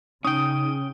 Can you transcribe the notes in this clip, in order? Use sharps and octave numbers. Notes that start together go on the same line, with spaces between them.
C#3 C#4 D#4 G5 D#6